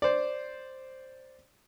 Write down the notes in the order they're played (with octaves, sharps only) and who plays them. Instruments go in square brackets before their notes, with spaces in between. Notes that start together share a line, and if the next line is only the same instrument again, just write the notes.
[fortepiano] C5 D5